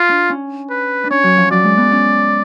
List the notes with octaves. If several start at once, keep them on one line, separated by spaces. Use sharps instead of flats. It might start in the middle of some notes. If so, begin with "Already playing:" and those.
Already playing: F4
D4
C#4
B4
D4
C#4 C#5
F#3
F3
F#3 D5
G#3
B3
C#4